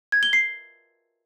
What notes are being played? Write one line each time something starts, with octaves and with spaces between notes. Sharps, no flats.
G#6
G7
C7